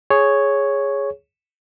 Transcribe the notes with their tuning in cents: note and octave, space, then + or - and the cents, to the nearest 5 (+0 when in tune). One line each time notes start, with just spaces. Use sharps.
G#4 +0 C#5 +0